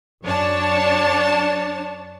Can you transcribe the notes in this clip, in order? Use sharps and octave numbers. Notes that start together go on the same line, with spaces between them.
F#2 D4 C#5 A5